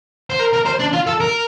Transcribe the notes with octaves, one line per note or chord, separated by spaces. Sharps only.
C5
A#4
A#4
C5
D4
F4
A4
A#4